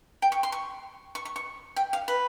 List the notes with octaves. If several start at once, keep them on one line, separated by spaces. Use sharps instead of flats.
G5
C#6
C6
C#6
C#6
C#6
C#6
G5
F5
B4